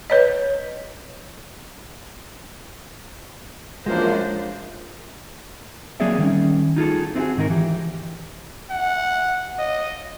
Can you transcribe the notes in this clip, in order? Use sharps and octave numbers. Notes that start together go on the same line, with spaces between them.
B4 C#5 D#5
F#2 E3 F3 G#3 A#3 D4 F4 C5
F#3 A#3 C4 G#4 D5 E5
D#3 G3 C#4
D#4 F4 G#4 A4
C4 D#4 E4 F#4 G#4
G#2 D#3 D#4 A#4
E3 G4
F#5
D#5